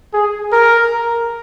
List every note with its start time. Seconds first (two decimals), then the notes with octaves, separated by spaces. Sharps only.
0.14 G#4
0.53 A#4